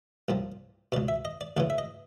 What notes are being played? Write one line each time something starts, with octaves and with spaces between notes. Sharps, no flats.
C2 A#2 F3
C#2 B2 D5
E5
D#5
D5
D2 C#3 E3 D5
E5
D#5